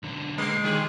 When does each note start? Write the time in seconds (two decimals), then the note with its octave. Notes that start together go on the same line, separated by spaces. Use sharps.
0.03 B1 D3
0.38 G#3 A3
0.64 D#3 E3 G4 G#4